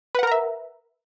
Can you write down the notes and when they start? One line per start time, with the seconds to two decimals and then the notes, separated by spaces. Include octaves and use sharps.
0.15 B4
0.19 F#5
0.23 A#4
0.27 A#5
0.31 E5